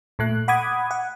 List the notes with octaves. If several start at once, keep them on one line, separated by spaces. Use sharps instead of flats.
A#2 A3 F#6
F#5 B5 D6 D#6 G#6
F#5